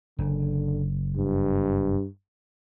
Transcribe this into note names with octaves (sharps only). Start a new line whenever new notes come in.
F#1 D3
G2